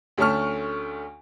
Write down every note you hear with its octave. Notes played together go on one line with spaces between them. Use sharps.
D2 A3 C#4 A5 C#6 F6